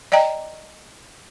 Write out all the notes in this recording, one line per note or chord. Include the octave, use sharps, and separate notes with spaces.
D5 D#5 G5 A#5